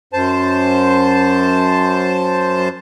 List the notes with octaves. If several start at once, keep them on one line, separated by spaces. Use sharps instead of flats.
F#2 C5 A5